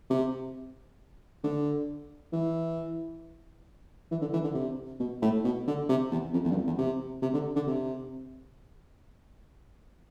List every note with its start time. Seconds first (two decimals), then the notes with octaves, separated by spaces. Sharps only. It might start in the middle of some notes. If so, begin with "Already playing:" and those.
0.10 C3
1.43 D3
2.33 E3
4.11 E3
4.21 D3
4.33 E3
4.44 D3
4.55 C3
5.00 B2
5.22 A2
5.44 B2
5.67 D3
5.89 C3
6.11 E2
6.33 F2
6.44 E2
6.51 G2
6.56 F2
6.67 E2
6.78 C3
7.22 C3
7.33 D3
7.56 D3
7.67 C3